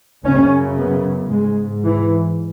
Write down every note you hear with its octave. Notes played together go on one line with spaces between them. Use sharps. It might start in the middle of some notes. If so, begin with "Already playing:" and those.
F#2 C#3 C#4
B3
G#2 G#3
E3